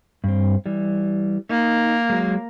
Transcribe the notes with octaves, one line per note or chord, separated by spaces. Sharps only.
G2 C4
E3 G3
A#3 D#4
F#3 G#3